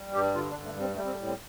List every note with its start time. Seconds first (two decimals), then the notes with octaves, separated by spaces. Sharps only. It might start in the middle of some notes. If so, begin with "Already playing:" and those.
Already playing: G3
0.14 G2 G4
0.35 D3 F4
0.50 D4
0.55 G2
0.65 A3
0.76 G3 C4
0.96 G3 A3
1.05 C4
1.12 A3
1.17 A2
1.27 C4